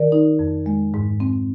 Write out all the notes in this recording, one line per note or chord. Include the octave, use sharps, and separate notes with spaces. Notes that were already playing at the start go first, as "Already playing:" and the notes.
Already playing: D#3 A#4 D5
D#4
F2
G#3
G#2
C4